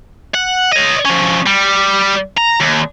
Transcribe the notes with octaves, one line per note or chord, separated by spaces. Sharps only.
F#5
C#5 D#5
F3 C#4
G3
A#5
D#2